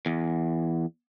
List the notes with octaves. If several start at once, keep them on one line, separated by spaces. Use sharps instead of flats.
E2